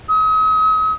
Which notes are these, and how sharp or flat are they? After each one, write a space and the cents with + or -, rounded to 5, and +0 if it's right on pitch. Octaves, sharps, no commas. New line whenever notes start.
D#6 +40